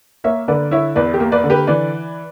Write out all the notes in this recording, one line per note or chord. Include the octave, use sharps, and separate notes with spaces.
A#3 C#5 E5
D3 B4 D5
E4 C#5 E5
E2 B4 D5
G4
A#3
B4 D5
D3
G4 B4
E3 B4 D5